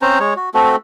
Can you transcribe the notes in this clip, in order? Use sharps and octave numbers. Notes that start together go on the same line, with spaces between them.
C4 C#4 C5 A#5
G#3 C#5
F#4
A3 C4 F#4 A4